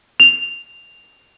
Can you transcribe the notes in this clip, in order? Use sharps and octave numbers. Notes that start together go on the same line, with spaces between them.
F7